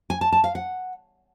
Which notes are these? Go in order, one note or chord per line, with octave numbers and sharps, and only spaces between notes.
G#5
A5
A5
F5
F#5